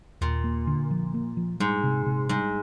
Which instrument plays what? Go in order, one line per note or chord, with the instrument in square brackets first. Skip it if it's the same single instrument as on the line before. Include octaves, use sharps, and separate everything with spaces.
[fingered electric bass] D#2 [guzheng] A#2
[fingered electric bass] A#3
D3
F3
A#3
F3
[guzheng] G#2 [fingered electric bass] G3
[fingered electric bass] C3
C3
[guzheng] G#2 [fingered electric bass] G3